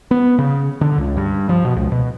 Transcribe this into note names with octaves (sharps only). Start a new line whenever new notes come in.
B3
C#3
D3
C#2
G2
F3
B2
C#2
B2